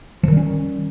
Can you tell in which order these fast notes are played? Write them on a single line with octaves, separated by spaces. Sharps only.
F3 D#3 G3 C#4